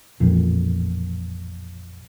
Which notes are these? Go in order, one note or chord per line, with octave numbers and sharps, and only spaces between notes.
A1 F2 A#2